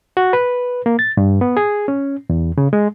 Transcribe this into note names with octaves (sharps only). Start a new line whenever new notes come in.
F#4
B4
A#3
A6
G2
B3
G#4
C#4
E2
C#3
G#3